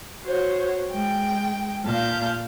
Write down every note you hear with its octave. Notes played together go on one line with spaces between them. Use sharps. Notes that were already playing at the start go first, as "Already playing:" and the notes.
F#4 C5 C#5
G#3 G5
A#2 F5 A5 G6